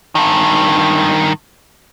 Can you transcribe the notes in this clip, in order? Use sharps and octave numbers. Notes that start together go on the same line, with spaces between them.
G2 D#3